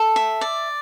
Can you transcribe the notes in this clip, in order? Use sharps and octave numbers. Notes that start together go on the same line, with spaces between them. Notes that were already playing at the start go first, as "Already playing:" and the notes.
Already playing: A4
E5
D5